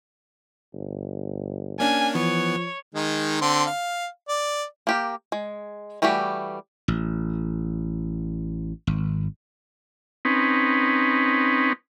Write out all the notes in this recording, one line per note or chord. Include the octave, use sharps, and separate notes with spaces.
G1
A#3 C#4 D4 G#5
E3 F3 B3 C#5
D#3 G#3 D#4
D3 C4 C6
F5
D5
A#3 G4 A#4
G#3
E3 G3 A3 F#4 G4
A1
G#1
C4 C#4 D#4 B4